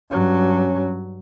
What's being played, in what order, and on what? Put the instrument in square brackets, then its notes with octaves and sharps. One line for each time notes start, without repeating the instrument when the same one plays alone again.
[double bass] G2 F#3 [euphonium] C#4